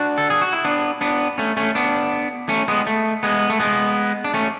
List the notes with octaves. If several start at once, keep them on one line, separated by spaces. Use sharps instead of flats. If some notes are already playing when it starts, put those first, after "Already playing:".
Already playing: D4 F#4
A4
G#4
F#4
E4
B3 D4
B3 D4
A3 C#4
A3 C#4
B3 D4
A3 C#4
G#3 B3
A3
G#3 B3
A3
G#3 B3
D4
A3 C#4